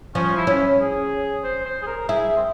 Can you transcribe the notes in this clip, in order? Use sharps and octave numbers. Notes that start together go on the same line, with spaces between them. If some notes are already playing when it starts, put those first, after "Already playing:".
F3 C#4
E4
C#4
G#4
C5
C5
G#4
A#4
E4 G#4
C4